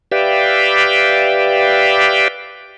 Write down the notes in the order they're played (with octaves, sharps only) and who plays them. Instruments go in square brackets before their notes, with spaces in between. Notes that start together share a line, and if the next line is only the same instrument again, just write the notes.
[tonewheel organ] G4 B4 D5 E5 F5 G5